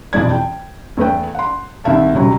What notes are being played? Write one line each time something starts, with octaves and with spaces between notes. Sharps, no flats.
E1 F2 E3 G#3 D5 G#6
G5
E2 A3 B4 G5
F#5 C6
C2 D#3 E5 A5
E1 C#2 F#3 G3